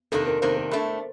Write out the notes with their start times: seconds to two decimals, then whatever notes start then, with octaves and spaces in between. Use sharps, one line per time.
0.12 C3 D#3 A#3 D4 A4
0.27 A#4
0.42 C3 D#3 A#3 D4 C5
0.57 A#4
0.71 A2 A3 D4